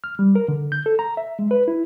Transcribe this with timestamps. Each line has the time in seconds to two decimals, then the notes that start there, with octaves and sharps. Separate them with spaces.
0.04 F6
0.19 G3
0.35 A#4
0.48 D3
0.72 G6
0.86 A4
0.99 A#5
1.17 E5
1.39 G#3
1.51 B4
1.68 E4